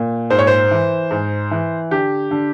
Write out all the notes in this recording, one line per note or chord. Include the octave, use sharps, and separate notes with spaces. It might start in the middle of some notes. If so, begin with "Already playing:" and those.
Already playing: A#2
G#2 C5
C#5
C5
E3
G#2
E3
D3 G4
D3